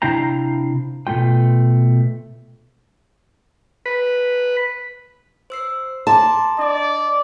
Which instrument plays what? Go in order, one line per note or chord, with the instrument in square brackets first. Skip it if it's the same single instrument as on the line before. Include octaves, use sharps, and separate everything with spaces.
[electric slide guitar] C3 D4 E4 F5 G5 A#5
B2 A3 A#3 F4 G5
[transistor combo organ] B4
[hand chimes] C5 E6 C7
[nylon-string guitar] A5 [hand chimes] A#5 C6 D6
[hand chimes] D4 D#5 [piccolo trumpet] D5